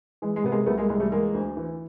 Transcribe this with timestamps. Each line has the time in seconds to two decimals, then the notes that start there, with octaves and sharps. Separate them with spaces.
0.22 E3 G#3
0.36 G#3
0.44 C3 B3
0.52 G#3 A#3
0.66 C2 A3 B3
0.77 G#3 A#3
0.89 C2 G#3
1.00 G3 A3
1.12 E3 G#3 A#3
1.34 D2
1.57 E3